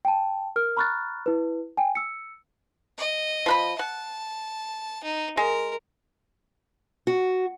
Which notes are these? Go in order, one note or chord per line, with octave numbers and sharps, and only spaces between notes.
G5 A5
A#4 F6
A#5 B5 C#6 F6 F#6 A6
E4 B4
G5 G#5
E6 C#7
D#5
F3 B4 B5
F#5 A5
D#4
G#3 A#4
F#4